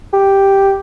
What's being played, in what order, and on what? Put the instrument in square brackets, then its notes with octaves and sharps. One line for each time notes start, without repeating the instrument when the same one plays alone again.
[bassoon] G4